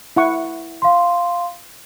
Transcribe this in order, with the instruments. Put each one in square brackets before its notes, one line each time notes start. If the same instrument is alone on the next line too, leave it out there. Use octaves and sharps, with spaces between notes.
[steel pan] E4 F#5 C#6
[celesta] F5 C6